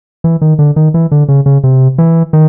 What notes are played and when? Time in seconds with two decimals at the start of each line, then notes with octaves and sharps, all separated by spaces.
0.24 E3
0.42 D#3
0.59 D3
0.76 D#3
0.94 E3
1.12 D3
1.29 C#3
1.46 C#3
1.64 C3
1.98 E3
2.33 D#3